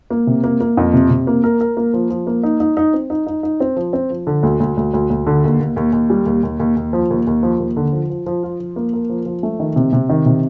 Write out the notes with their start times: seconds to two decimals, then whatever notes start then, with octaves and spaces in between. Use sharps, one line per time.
0.10 A#3
0.27 C3
0.44 A#3
0.61 A#3
0.77 F2
0.94 C3
1.10 C3
1.27 A#3
1.44 A#4
1.61 A#4
1.77 A#3
1.94 F3
2.10 F3
2.27 A#3
2.43 D#4
2.60 D#4
2.77 D#4
2.93 C4
3.10 D#4
3.27 D#4
3.43 D#4
3.60 C4
3.77 F3
3.93 C4
4.10 F3
4.27 D3
4.43 D2
4.60 D2
4.77 D2
4.94 D2
5.10 D2
5.27 D3
5.44 D#2
5.60 D#2
5.76 D#2
5.93 D#2
6.10 G3
6.26 D#2
6.43 D#2
6.60 D#2
6.76 D#2
6.93 F3
7.10 D#2
7.27 D#2
7.43 F3
7.59 D#2
7.77 D3
7.93 F3
8.10 F3
8.26 F3
8.43 F4
8.60 F3
8.76 A#3
8.93 A#4
9.09 F3
9.26 F3
9.43 A3
9.60 D#3
9.76 C3
9.93 C3
10.09 D#3
10.26 C3